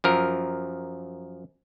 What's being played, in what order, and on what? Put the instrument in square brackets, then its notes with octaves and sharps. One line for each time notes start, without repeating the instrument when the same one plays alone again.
[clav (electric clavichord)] F#2 F3 A#4